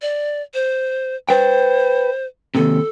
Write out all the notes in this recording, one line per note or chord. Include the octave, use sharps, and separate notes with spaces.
D5
C5
B4 C5 G5
D#2 G#2 C3 A4